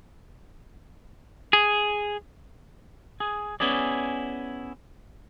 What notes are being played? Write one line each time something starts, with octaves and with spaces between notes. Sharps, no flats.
G#4
G#4
B3 C#4 E4 G#4 D5